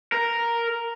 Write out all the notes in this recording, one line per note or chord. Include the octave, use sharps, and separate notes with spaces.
A#4